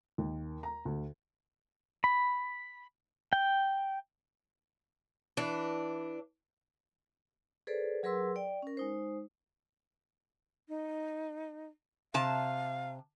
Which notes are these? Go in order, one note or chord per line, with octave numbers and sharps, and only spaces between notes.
D#2
A#5
D2
B5
G5
E3 D4
G#4 A4 B4 C5 D5
F#3 G#4 A#4 B4 C6 E6
D5 G5
C#4 A#4
G#3 D#4 C5
D#4
C3 F5 A5